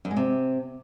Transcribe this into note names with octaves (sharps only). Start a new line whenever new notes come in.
F#2
G#3
C3